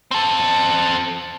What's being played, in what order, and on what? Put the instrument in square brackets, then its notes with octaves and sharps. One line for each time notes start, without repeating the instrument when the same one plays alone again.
[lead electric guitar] C4 A4